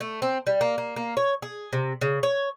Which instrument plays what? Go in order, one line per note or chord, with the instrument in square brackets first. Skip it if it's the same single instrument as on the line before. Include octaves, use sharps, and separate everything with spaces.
[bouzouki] A3
C4
G3
A#3
A#3
A#3
C#5
G#4
C3
C#3
C#5